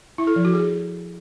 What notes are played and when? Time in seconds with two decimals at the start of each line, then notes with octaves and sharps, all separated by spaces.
0.18 E4
0.27 A4
0.36 F3
0.45 F#4
0.54 G#4